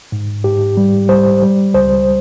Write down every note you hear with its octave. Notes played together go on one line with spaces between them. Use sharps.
G#2
G#2 G4
G3
G3 C5
G3
C#2 C5